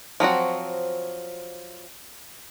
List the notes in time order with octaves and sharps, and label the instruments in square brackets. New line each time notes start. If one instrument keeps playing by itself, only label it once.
[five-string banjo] F3 F#3 C4 F#4